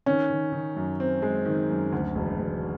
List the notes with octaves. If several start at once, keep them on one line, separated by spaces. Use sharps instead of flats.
D#3 C#4
D#3
D#3
F#2
C4
G#3
D#3
F#2
D2
E1
E1